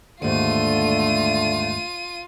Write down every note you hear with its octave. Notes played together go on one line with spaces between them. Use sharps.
D#2 G#2 D3 A3 F4 D#7